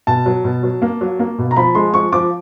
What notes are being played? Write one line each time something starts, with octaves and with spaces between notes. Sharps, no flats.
B2 A5
F#3
B2
F#3
A#3
F#3
A#3
B2
A#5
F3 B5
G#3 C6
F3 C#6
F3 D6